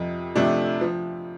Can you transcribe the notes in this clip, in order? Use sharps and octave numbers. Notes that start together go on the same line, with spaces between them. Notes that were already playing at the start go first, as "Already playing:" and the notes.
Already playing: F2 C3 F3
C3 F3 A3 D4
F3